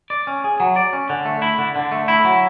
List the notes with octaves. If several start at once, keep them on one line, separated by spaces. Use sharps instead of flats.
D5
C#4
G#4
F#3
D5
C#4
D3
A3
E4
D3
D3
A3
E4
F#3